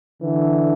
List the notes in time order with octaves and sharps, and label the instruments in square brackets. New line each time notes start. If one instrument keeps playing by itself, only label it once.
[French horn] D3 [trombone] E3